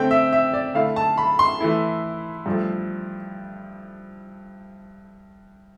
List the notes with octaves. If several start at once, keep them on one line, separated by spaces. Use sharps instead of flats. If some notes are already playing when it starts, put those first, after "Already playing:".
Already playing: D3 A3 C4 G5
E5
E5
D5
D3 A3 E4 F5
A5
B5
C6
E3 A3 E4
G2 F3 A3